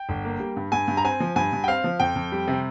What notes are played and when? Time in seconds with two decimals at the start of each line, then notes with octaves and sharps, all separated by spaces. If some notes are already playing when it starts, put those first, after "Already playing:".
Already playing: G5
0.09 G1
0.24 A#3
0.40 G3
0.56 G2
0.72 G2 G#5
0.88 G2
0.97 A#5
1.05 C4 G#5
1.20 F3
1.36 G2 G#5
1.53 G2
1.64 G5
1.68 C4 F5
1.84 F3
2.00 F2 G5
2.16 F2
2.32 G3
2.47 C3